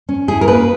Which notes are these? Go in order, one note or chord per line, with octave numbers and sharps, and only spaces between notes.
C#4
E4 G#4
A#4
A#3 B4